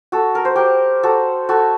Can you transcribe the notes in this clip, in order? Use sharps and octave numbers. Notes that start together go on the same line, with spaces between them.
F#4 A4
A#4
C5
G4 A#4
F#4 A4
F#4 A4